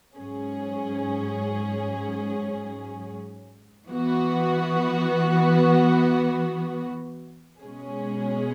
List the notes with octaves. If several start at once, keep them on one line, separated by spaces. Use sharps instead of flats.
G#2 F#3 C#4 G#4
E3 B3 F#4
B2 G#3 C#4 G#4